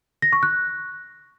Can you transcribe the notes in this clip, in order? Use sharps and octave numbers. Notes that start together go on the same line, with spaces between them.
A#6
C#6
F#6